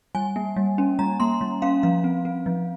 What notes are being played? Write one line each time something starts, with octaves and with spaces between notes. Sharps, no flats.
G3 G#5
A#3
G3
C#4
G3 A#5
A#3 C6
G3
C#4 F5
F3 F5
C4
C4
F3